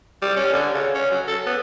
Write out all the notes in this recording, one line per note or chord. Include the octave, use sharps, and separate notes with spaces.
G3
C#4
D3
C#3
C#4
F#3
A4
B3